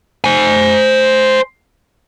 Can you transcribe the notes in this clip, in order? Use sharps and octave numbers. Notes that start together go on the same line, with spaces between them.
C5 G#5